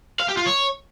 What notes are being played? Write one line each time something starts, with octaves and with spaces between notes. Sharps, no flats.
F5
G4
F4
C#5